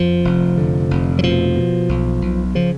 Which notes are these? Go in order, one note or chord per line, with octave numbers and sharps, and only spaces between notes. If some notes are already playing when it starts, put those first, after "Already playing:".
Already playing: F2 F3
F1
D3
F1
F#3
B2 F3
B2
B1
B1
C#3 F3